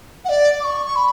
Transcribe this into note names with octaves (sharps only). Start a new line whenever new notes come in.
F#5
D5
D6
C#6
C#6
B5